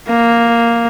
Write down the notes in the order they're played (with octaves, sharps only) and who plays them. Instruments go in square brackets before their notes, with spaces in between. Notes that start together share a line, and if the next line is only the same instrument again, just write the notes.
[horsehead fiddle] A#3